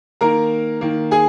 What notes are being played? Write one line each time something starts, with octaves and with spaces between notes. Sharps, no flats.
D#3 A#3 A#4 A#5
D#3 A#3
G#4 G#5